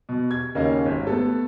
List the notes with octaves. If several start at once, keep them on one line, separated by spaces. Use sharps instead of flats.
B2
G#6
D#2 C#3 A#3 C#4 D#5 F5
G#1
A3 B3 A4